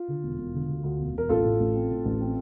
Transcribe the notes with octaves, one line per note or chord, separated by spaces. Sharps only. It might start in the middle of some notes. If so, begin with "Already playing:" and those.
Already playing: F4
D3
E1
E1
D3
D2
D2
E1
E1 A#4
A1 F4 A4
A2
A1
C4
A2
A1
C4